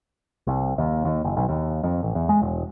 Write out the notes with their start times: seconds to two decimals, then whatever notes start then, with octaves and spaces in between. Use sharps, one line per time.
0.47 C2
0.78 D#2
1.05 D#2
1.24 F#1
1.37 B1
1.49 D#2
1.83 F2
2.03 A1
2.15 E2
2.29 G#3
2.42 E1